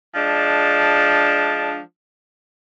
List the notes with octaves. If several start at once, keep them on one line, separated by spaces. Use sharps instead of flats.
F3 G#3 D4